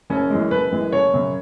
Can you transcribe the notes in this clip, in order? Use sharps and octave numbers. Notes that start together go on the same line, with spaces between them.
F#1 C#4
F#2 E3 G#3
F#1 B4
F#2 E3 G#3
F#1 C#5
F#2 C#3